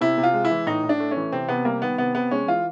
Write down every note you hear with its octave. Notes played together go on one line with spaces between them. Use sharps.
C3 E4
C3
F4
G#3
E4
E3
A2 D#4
A2
D4
A3
C#4
E3
C3 C4
C3 B3
G3 A#3
D#3 B3
C3 B3
C3 B3
G#3 C#4
E3 F4